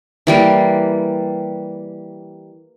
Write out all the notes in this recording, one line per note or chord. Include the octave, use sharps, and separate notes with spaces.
E3 G3 A#3